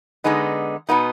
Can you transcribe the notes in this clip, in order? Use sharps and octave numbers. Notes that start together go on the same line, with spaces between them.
D3 G#3 B3 D#4
B2 B3 D#4